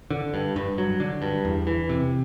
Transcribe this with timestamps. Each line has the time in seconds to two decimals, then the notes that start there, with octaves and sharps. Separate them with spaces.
0.10 D3
0.34 G2
0.56 G2
0.78 F#3
1.00 D3
1.22 G2
1.45 E2
1.67 E3
1.89 C3